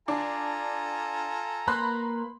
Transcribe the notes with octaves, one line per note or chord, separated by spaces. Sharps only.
D4 F4 A4 G#5 A#5
A#3 B4 B5 C6 F#6